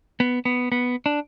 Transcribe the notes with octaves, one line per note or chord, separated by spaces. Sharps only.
B3
B3
B3
D4